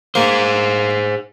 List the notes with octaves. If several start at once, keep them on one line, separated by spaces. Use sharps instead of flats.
A#3 G#4 C5